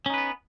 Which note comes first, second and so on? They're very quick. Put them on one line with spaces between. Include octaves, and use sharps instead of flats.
C#4 D#4 B4 B3